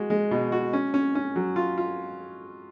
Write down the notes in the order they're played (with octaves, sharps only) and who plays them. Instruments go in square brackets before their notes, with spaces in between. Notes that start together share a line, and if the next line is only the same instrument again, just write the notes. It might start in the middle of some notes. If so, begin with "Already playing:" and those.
Already playing: [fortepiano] G#3 F#4
G#3
B2
F#4
C#4
C#4
C#4
F#3
F4
F4